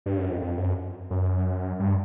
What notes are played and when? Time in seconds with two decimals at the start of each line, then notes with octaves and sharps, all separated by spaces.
0.06 G2
0.18 F#2
0.30 F2
0.41 F2
0.58 F#2
1.10 F#2
1.79 G2